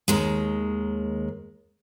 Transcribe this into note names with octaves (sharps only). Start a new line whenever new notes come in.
D#2 D#3 G#3